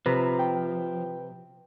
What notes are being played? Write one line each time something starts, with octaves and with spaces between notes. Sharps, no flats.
C3 F3 B4 A#5
G5